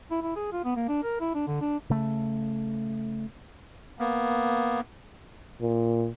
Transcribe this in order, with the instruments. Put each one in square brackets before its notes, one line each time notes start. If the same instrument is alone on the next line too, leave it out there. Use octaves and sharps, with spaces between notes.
[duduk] E4
E4
G#4
F4
B3
A#3
D4
A#4
E4
D4
D3
D4
[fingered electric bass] C#3 A3
[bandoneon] A#3 B3
[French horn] A#2